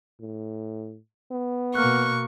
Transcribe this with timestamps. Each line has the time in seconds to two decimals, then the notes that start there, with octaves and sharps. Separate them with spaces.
0.20 A2
1.31 B3
1.75 B2 A#3 C#6 F6 F#6